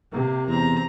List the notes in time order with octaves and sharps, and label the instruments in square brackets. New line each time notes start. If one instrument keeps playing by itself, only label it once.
[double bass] C3 [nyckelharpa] A#3 G4
[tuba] E2 [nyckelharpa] C4 A#5